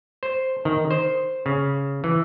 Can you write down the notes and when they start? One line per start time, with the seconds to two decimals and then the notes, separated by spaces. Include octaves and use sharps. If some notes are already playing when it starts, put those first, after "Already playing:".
0.23 C5
0.65 D#3
0.91 C5
1.46 C#3
2.04 E3